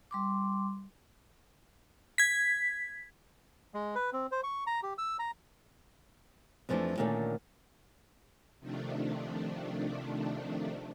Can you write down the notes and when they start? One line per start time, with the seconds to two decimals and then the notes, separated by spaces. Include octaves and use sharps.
0.11 G3 C6 D6
2.18 G#6 B6
3.74 G#3
3.95 B4
4.13 C4
4.31 C5
4.44 C#6
4.67 A#5
4.83 G4
4.98 E6
5.19 A#5
6.69 F2 E3 F3 G#3 A3 D4
6.98 A#2 D3 D#3 A3 C#4
8.59 C3 D#3 F3 A3 D4